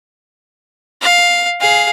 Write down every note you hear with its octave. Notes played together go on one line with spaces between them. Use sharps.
F5
G#4 F5